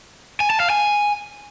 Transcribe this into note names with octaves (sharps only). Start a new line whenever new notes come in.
G#5
A5
F5
G#5